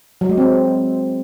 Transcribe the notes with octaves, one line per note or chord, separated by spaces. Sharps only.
F#3
G#3
C4